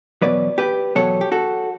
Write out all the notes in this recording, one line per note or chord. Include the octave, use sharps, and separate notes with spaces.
E2 B2 F#3 B4 D5
G4 B4
E2 B2 F#3 A4 C#5
G4
F#4 A4